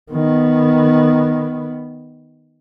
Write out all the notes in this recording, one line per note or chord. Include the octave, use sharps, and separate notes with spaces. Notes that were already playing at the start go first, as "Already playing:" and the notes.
D#3 B3